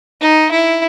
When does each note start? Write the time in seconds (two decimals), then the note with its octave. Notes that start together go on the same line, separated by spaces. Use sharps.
0.21 D#4
0.52 E4